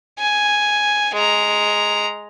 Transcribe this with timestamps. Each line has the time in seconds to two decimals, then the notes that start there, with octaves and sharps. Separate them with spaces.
0.19 G#5
1.15 G#3 A#5